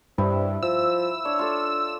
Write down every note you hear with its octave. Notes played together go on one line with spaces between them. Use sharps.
G2 C3 E4
F3 E6
D4 C#5
F4 A4 D5